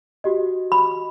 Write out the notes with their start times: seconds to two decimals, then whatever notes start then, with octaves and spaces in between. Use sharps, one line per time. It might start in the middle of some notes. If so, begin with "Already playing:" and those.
0.24 F#4 G4 D#5
0.72 B5